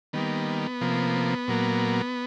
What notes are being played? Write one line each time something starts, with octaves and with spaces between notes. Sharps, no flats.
D#3 G3 A#3 B3
C3 F3 A#3
A#2 F#3 A#3